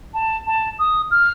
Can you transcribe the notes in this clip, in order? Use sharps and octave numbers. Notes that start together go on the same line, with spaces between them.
A5
A5
D#6
F6